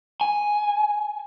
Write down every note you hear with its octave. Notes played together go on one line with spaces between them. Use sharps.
G#5